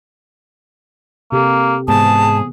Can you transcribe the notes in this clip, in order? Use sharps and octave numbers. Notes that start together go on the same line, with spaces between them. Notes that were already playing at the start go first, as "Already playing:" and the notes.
C3 A#3 G4 A4
G#2 C3 E3 B3 G#4 A5